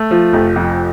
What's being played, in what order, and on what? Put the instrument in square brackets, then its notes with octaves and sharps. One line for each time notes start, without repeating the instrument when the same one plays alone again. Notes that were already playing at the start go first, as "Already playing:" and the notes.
Already playing: [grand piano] A3
F3
F1
F2